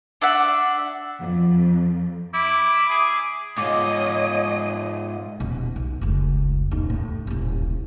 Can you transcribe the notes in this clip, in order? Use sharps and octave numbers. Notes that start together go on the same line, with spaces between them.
D4 E5 F#5
F2
E4 D6
G#4
G#2 F4 C#5 D#5 D6
D#1 B2
B1
F1 C#2
D#1 D#4
A2
D#1 C2